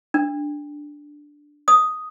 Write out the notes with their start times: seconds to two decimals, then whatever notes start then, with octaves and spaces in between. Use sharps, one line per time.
0.14 D4
1.68 D#6